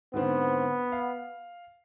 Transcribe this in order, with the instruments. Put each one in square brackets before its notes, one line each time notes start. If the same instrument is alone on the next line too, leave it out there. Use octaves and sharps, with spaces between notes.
[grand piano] G#2 D3 C4 [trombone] B3
[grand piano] F5